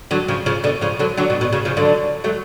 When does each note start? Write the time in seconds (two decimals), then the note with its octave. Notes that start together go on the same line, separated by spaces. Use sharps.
0.11 D3 F#3
0.28 C#3 F3
0.46 C#3 F3
0.64 B2 D3
0.81 C#3 F3
0.99 D3 F#3
1.17 D3 F#3
1.30 B2
1.41 B2
1.53 C#3
1.65 C#3 F3
1.77 D3 F#3
2.24 F#3 A3